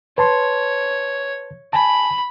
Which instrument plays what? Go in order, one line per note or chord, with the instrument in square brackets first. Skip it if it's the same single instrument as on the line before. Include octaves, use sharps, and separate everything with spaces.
[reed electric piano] B4 A5 C6 [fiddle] C#5
[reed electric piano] G#5 A5 [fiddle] B5